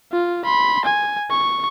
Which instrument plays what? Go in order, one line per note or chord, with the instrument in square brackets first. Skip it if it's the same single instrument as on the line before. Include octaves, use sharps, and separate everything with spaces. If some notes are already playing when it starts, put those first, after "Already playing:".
[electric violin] F4
B5 C6
G#5
C#6